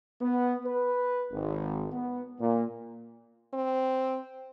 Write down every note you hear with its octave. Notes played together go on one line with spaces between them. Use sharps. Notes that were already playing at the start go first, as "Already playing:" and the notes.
B3
B4
G#1
B3
A#2
C4